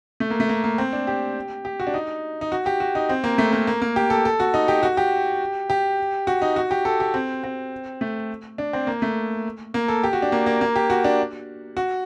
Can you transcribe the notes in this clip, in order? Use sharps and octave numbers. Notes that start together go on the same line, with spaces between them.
A3
A#3
A3
A#3
A#3
C4
D4
G4
G4
F#4
D4
D#4
D#4
F#4
G4
F#4
D#4
C4
A#3
A3
A#3
A#3
A#3
G4
A4
A4
F#4
D#4
G4
F#4
G4
G4
F#4
D#4
F#4
G4
A4
G4
C4
C4
A3
D4
C4
A#3
A3
A#3
A4
G4
F#4
D4
A#3
A#3
A#3
G4
F#4
D4
F#4